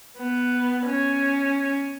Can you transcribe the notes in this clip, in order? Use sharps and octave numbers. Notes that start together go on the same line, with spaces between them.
B3
C#4